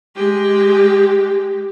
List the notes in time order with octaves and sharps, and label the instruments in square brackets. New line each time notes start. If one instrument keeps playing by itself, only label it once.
[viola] G#3 G4